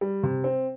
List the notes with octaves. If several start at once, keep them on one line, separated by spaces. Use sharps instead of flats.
G3
C3
C4